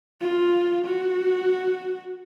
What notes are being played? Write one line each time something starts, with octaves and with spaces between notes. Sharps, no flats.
F4
F#4